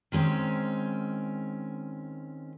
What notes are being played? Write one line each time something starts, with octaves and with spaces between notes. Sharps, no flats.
D#3 G#3 C4 C#4